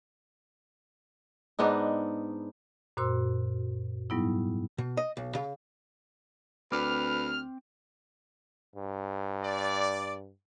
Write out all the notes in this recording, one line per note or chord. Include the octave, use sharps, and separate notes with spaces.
G#2 B3 D4 D#4
F#2 A#2 F#4 C5 C6 E6
G#2 F#3 G3 B3 D#4 E4
B2
D#5
B1
C#3
D2 C4 B4 D6 F6
G2
D5